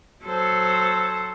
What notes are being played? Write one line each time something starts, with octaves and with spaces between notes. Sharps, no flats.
F#3 A4 C5